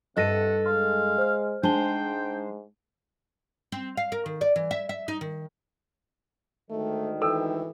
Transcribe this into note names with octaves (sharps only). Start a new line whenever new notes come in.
G2 C3 A4 D#5 F#5 A#6 D#7
G#3 F5 C6
C5 F6
G#2 G#3 D4 C5 G5 A5 G7
C4
F5
A#4
D#3
D5
E3
E5
E5
D#4
D#3
D2 G#2 D#3 A3
E3 A4 G5 E6